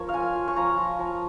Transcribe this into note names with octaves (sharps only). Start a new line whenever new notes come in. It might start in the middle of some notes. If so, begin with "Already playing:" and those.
Already playing: F3 A#4 C#5
F5
F4 G#5
F4
C#6
F3 A#5
F4
F3